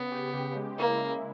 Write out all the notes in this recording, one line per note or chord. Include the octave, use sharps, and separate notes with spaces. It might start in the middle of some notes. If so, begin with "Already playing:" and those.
Already playing: C#3 B3
G4
C#3
G#3
A#3 E4
E4